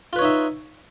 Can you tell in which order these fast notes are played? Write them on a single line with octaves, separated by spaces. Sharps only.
F4 B4 C#5 D#4 E5